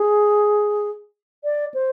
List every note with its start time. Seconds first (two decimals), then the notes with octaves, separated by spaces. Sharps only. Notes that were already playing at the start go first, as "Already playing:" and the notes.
Already playing: G#4
1.44 D5
1.74 C5